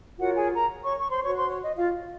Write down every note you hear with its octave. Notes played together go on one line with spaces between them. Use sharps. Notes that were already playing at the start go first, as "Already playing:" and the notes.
F4 F#4 A#4 C#5 F#5
G#4 G#5
A#4 A#5
C#5 C#6
C#6
C5 C6
F#4 C5 C#5 C#6
C5 C6
C#5
D#5
F4 F5